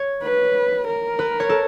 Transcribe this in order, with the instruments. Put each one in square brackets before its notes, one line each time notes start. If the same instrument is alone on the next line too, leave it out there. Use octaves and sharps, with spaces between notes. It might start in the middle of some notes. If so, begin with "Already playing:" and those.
Already playing: [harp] C#5
[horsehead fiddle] B4
A#4
[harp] B4
C#5
A4